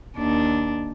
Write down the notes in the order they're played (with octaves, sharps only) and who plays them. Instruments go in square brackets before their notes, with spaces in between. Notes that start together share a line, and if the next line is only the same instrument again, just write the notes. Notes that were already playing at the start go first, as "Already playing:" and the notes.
[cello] D#2 D4